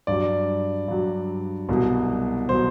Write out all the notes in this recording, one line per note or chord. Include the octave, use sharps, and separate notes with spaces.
G2 F#3 D5
G2 F#3
C2 B2 F#3
B2 F#3 C5